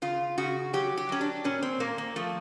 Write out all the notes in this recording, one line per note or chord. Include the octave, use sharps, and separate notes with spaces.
C#3 F4
C#3 F#4
F#3 G4
G4
F#3 C#4
D4
A#2 C#4
C4
A#2 A#3
A#3
F3 A3